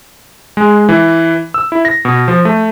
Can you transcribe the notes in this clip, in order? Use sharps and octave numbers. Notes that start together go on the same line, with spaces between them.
G#3
E3
E6
E4
A#6
B2
F3
A3